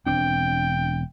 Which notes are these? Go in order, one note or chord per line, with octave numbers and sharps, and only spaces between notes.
E1 C4 D4 G5